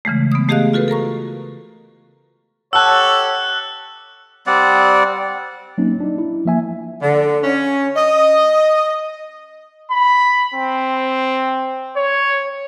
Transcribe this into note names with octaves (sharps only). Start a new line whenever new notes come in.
C#3 E3 G#3 A3
B3 D#6
A3 G4 G#4 D#5 F5 F#6
F4 F#4 A4 B4
A4 A#4 A#5 C#6
G4 A4 C#5 F#5 A5 E6 F#6
G3 C4 D5 F#5
F#3 A#3 C4 C#4 D#4
D4 D#4
E4
F3 A#3 E5 G#5
D3
C#4
D#5
B5
C4
C#5